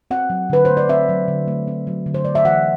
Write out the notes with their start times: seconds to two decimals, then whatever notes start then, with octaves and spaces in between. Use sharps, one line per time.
0.11 C4 F#5
0.30 F#3
0.50 D3 B4
0.65 A3 C5
0.77 D5
0.89 C4 E5
1.09 F#3
1.28 D3
1.48 A3
1.67 C4
1.87 F#3
2.06 D3
2.14 C5
2.25 A3 D5
2.35 E5
2.45 E3 F#5